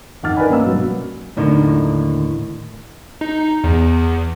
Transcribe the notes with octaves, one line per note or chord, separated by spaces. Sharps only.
F2 D#3 F#5 D6 F6 A6
A#4 B4 D5 D#5 G#5 B5
A#3 C#4 F5 E6
G2 B2 F#3
D#2 A2 D3 D#3
D#4
E2